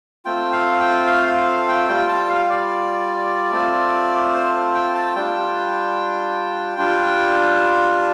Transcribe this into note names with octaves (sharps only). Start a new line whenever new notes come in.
A3 C4 F4 G5
F5
G5
F5
F5
F5
G5
G3 F4 G5
A5
F5
D5
A3 C4 F4
C5
G5
A5
G3 D4 F4 G5
G3 D4 F4